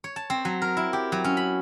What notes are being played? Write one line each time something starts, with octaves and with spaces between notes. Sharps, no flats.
C#5
A5
C4
F#3
A#4
E4
G4
F#3
C#4
B5